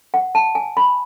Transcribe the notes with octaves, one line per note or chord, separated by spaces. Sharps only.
F#5
A5
G#5
B5